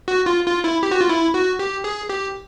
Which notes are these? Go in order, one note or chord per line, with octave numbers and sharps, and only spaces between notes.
F#4
F4
F4
E4
G4
F#4
F4
E4
F#4
G4
G#4
G4